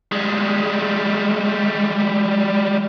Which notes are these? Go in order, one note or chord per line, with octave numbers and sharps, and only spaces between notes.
G3 G#3